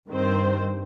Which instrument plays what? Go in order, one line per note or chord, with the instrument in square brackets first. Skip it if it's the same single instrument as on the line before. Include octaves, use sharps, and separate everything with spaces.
[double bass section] G2 [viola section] D#3 C4 C5